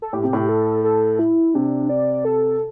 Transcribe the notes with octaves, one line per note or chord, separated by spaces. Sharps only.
A4
A2 G4
C3
A2
A4
A4
E4
C3 D4
D5
A4